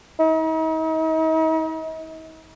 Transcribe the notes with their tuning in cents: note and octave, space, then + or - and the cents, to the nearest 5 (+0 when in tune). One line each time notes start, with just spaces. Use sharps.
D#4 +45